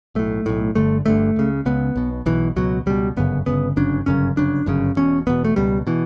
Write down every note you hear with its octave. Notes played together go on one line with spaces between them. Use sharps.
B1 A2 A3
B1 A2
G1 G2 D3 A3
G1 G2 D3 A3
C#2 C#3
C#2 C#3 B3
B1 B2
B1 B2 E3
C#2 B2 F#3
C#2 B2 G3
G1 F#2 C#3 B3
G1 F#2 C#3 B3
G1 F#2 C#3 D4
G1 F#2 C#3 C#4
G1 F#2 C#3 D4
G1 F#2 C#3
E1 E2 B2 C#4
E1 E2 B2 B3
A3
C#2 B2 G3
B2 E3